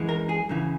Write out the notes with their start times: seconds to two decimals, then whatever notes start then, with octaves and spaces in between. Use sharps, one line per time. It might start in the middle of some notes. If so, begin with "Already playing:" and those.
Already playing: F#2 E3 G#3
0.09 A#4
0.29 G#4
0.49 F#2 C#3 E3